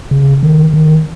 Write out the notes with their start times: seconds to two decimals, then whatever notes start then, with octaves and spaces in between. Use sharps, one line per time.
0.11 C#3
0.43 D#3
0.74 D#3